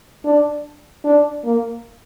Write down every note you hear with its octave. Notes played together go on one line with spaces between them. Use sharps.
D4
D4
A#3